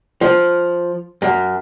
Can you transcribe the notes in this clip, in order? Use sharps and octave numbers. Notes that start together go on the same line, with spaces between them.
F3
F#2